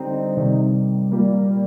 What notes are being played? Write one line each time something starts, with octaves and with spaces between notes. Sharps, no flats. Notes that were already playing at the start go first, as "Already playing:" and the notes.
Already playing: D3 G3 C4 D#4
C3 D#3 G3
A#2 G3 A#3